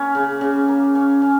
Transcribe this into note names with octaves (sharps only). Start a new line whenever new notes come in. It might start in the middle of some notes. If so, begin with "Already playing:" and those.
Already playing: A#3 C#4
C#3
C#3
A#3
C#4
C#4